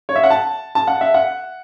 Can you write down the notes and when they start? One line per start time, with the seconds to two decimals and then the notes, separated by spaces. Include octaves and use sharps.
0.09 C#5
0.16 E5
0.24 F#5
0.30 A5
0.75 A5
0.87 F#5
1.01 E5
1.14 F#5